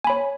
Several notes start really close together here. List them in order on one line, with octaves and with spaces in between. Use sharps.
G#5 B5 C#5